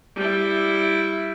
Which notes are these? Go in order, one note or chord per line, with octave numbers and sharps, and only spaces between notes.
G3 E4